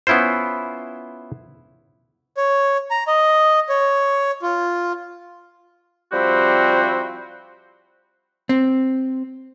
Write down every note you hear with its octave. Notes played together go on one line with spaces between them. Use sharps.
B3 C#4 E4 F4 C5
C#5
A#5
D#5
C#5
F4
F3 G3 C4 E4 F#4 G4
C4